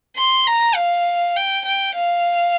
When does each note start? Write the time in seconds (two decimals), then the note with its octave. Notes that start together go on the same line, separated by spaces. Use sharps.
0.17 C6
0.47 A#5
0.76 F5
1.36 G5
1.65 G5
1.95 F5